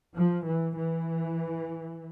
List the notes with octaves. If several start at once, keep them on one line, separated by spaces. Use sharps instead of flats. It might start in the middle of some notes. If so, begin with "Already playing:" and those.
F3
E3
E3